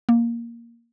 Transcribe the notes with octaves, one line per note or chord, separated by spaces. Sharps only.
A#3